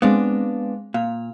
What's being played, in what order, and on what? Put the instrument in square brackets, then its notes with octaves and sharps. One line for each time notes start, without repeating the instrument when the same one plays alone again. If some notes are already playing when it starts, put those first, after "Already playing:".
[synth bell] G#3 C4 F5 [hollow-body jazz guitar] B3 D4
[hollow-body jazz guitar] A#2 [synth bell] F5